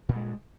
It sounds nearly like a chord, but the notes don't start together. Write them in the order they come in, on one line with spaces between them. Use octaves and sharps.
A#2 G2 G#3